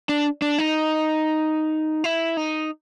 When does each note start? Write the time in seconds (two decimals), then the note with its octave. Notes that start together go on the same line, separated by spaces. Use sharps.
0.09 D4
0.42 D4
0.58 D#4
2.04 E4
2.37 D#4